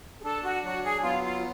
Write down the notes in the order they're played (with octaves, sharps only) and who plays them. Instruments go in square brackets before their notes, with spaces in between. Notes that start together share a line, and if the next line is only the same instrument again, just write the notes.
[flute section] G#4
[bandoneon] D4 [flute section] A4
[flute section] F#4
[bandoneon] F#3 [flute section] F#4
[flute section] G#4
[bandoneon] B3 [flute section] F4
[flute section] F4